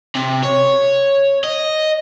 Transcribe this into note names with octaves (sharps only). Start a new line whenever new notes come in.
C3
C#5
D#5